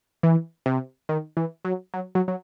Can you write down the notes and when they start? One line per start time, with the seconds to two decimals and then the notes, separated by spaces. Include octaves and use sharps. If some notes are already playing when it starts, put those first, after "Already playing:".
0.23 E3
0.66 C3
1.09 D#3
1.37 E3
1.65 F#3
1.94 F#3
2.15 F#3
2.28 F#3